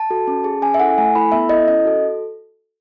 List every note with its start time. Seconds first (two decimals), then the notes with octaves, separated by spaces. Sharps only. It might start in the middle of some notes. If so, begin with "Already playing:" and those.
Already playing: A5
0.10 F#4 A4
0.27 C#4
0.44 G#4
0.62 C#4 G#5
0.74 E5
0.80 E4 A4 F#5
0.98 A3 G#5
1.15 E4 A4 B5
1.32 B3 E5
1.49 E4 A4 D#5
1.68 C#4 D#5
1.84 F#4 A4